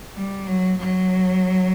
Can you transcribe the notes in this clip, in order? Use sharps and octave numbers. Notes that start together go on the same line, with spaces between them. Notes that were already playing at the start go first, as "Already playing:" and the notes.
G3
F#3
F#3